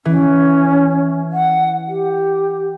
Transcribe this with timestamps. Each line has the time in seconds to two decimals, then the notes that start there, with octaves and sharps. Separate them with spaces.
0.05 E3 C#4
1.33 F#5
1.88 G4